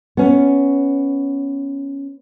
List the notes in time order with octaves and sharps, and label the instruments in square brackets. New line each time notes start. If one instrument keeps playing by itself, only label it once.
[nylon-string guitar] B3 C#4